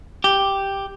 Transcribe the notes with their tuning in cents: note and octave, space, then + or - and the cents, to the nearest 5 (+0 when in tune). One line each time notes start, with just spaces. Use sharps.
G4 +0